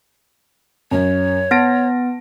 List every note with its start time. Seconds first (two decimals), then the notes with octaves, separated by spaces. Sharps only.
0.91 F#2 C#5
1.51 B3 A5 A#6 D7